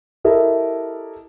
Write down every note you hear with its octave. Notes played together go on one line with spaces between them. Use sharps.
E4 G4 A4 A#4 D#5 E5